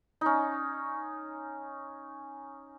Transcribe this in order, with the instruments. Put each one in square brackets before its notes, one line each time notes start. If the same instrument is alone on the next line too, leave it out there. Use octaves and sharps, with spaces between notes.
[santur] C#4 D#4